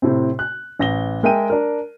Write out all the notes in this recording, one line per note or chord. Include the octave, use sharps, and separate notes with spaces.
A2 C3 C4
F#6
A1 A#6 G7
G#3 A#4 E5 G5 D#7
D4 A#4